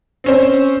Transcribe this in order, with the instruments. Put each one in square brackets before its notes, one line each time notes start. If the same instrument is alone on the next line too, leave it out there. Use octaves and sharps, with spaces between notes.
[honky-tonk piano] C4 C#4 C5